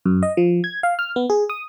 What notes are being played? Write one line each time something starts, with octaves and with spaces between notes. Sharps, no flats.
F#2
D#5
F3
G#6
F5
F6
B3
G#4
D#6